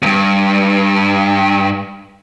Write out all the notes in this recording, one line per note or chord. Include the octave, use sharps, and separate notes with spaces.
E2 G2